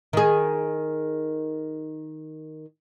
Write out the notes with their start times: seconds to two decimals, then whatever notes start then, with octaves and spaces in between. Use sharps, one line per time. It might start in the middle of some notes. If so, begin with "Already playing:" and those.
0.13 D#3 G#4